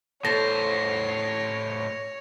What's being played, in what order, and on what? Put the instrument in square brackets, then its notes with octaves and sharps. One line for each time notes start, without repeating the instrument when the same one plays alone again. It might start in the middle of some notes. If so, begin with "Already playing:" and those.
[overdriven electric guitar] A2 C5 [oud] A4 [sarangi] C#5 [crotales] A#6